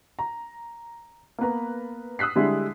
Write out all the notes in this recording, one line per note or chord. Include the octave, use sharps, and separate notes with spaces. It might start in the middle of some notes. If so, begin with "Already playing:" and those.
A#5
A#3 B3 B4 A#5
D#6 E6 F#6 B6 C7
D3 G3 G#3 E4